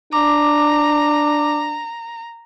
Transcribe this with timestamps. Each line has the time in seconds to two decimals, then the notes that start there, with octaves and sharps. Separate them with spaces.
0.13 D4 A#5 D6